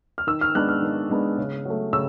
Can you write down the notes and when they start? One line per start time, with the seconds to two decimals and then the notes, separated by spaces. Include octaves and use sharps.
0.18 F6
0.27 D#3 E6
0.41 F6
0.55 G#3 B3 D4 F#6
0.69 F6
0.82 D#3
1.10 G#3 B3 D4
1.38 C#3
1.65 F#3 A3
1.93 C#3 E6